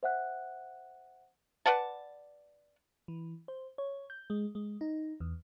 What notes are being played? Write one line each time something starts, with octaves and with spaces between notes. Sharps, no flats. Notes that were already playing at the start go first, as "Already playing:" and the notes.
C5 E5 F#5 F#6
B4 D5 F#5 A5
E3
C5
C#5
G6
G#3
G#3
D#4
E2